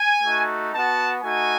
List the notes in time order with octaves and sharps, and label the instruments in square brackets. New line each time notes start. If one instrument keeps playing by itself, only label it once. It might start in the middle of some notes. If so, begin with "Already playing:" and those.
Already playing: [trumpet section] G#5
A3 D#4 F#4
B3 F#4 A5
A3 D#4 F#4 G#5